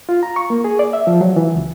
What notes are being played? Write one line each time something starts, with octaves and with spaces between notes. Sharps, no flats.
F4
A#5
C#6
A#3
G#4
D5
E5
F3
F#3
E3
C#2